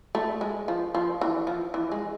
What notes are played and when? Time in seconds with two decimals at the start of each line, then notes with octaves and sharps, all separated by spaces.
0.15 A3
0.41 G#3
0.68 F3
0.95 F3
1.21 E3
1.47 F3
1.74 E3
1.92 G#3